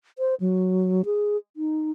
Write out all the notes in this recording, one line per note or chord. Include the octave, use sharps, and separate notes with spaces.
C5
F#3
G#4
D#4